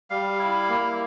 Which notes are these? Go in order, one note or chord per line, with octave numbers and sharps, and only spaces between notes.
G3 F5
E4
A#3